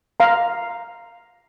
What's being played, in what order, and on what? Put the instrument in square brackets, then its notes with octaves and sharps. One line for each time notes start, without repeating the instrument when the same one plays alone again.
[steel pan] F5 A#5